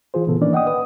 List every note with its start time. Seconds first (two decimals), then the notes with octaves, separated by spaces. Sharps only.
0.14 E3 F4 G#4 C5
0.27 A#2 C#3 E3 B3 A4
0.41 D#3 E3 A#3 C#4 D4 D5
0.53 D#5 F#5 G5 D#6
0.67 B4 D#6